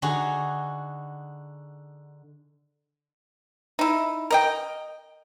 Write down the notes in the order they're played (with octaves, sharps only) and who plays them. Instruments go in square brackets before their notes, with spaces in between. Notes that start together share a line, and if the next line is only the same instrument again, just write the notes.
[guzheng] D3 D#4 F#4 G#4
[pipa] D#4 E4
A#4 D#5 G5